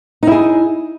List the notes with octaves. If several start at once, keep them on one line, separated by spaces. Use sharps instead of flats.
D#4 E4 G#4